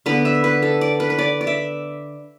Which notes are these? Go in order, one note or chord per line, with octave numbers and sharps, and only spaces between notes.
D3 B3 B4
E5
B4
A4
D5
B4
B4
D5
D5
E5